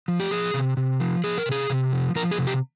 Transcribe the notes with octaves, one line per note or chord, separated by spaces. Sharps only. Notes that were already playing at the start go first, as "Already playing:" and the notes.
F3
G4
F3 G#4
C3
C3
F3
F3 G#4
A#4
C3
G#4
C3
F3
F3 A#4
G#4
C3
G4